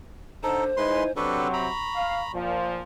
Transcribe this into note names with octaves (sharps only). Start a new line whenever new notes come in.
D3 D#4 A4 C5
G#3 D#4 E4 B4 G#5 C6
C3 F#3 C4 D4 A4 B4 C#6
A#5 B5
F5
A#2 F3